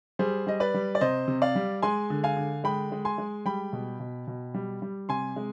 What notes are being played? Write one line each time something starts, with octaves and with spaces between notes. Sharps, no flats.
G3 G#4 C5
G3 D#5
B4 D5
G3
D5
C3 C5 D#5
C3
D5 F5
G3
G#3 G#5 C6
D3
F5 G#5
D3
G#3 G5 B5
G#3
G#5 C6
G#3
G3 G5 B5
B2
B2
B2
G3
G3
C3 G#5 C6
G#3